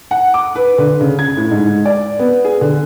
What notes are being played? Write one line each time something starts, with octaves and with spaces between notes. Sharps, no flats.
F#5
D6
B4
D3
C#3
G#6
A2
G#2
D5
B3
G#4
D3